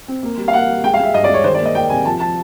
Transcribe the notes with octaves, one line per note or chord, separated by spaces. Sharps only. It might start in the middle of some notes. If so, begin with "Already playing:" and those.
C4
A#3
G3
F5
A#3 F#5
G3
G#3 G5
F5
G#3 E5
G2 D#5
D5
G#3 C#5
D#3 C5
D5
A#3
D#5
A#3 G5
C3 G#5
F3 A5
F3 A5